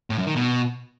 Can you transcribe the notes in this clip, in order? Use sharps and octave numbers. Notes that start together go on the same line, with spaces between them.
A2
F#2
D#3
B2